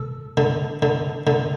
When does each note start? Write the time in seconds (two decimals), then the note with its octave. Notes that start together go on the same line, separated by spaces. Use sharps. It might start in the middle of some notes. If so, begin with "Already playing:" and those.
Already playing: A4
0.37 D3
0.82 D3
1.27 D3